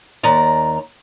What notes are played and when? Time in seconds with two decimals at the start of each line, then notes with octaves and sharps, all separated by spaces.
0.23 D#2 D5 A#5